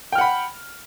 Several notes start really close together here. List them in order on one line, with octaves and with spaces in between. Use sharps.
G5 F6 F#5 B5